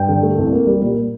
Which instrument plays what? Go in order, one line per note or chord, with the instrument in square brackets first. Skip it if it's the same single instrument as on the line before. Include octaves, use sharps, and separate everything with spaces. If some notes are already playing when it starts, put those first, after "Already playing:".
Already playing: [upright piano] G2 G5
D3
A3
C2
A#3
G3
A#2